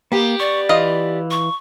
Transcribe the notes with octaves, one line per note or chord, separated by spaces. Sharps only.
A#3 B3 G4
D5 C#6
E3 F4 D#5
C#6